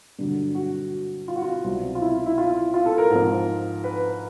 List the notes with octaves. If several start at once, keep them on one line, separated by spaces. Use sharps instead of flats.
G2 D3 F#3
F#4
F4
F#4
F4
C2 B2 F#3
F4
E4
E4
F4
F4
A4
A#4
G#2
F3
B4